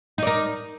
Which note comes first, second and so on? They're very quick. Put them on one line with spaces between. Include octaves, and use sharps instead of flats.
D#4 D5 A#4